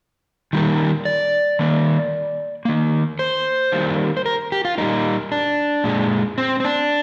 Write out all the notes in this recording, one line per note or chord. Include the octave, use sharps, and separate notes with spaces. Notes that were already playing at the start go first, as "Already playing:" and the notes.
D#3 G3 A#3
D5
D#3 A#3
D#3 A#3
C5
D#3 G3 A#3
C5
A#4
G4
F4
A#2 G3 A#3 D#4
D4
A#2 G#3
C4
C4
D4